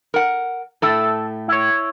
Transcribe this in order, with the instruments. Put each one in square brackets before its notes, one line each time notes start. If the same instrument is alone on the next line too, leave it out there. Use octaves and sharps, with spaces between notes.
[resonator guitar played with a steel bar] A#4 F#5
[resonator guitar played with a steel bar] A2 A3 [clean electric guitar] A4
[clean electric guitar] E4 C#5